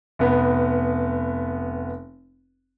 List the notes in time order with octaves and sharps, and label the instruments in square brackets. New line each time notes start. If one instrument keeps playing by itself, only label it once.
[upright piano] F1 B3